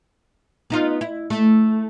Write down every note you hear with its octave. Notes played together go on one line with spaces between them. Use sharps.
B3 D#4 F4
E4
A3